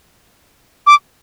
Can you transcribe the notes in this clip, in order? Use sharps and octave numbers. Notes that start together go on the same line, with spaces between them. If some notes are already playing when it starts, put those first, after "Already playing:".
D6